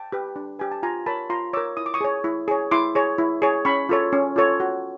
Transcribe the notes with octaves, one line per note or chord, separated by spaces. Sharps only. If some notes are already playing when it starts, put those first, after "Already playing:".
Already playing: G5 A5
G4 B4
D4
G4 B4 G#5
A5
F4 G#5 A#5
A#4 C#5 A5 B5
F4 A#5 C6
A#4 C#5 D6 E6
E4 D#6
D6
C#6 D#6
G#4 C#5
E4
G#4 C#5
E4 C6 D6
G#4 C#5
E4
G#4 C#5
C#4 B5 C#6
F4 A4 C#5
C#4
F4 A4 C#5
F#4